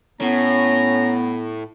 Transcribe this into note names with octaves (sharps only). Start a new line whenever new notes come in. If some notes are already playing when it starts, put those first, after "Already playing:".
A2 B3 C#4 A#5